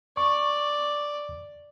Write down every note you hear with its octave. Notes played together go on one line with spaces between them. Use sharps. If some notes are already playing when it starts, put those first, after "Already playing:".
D5 C#6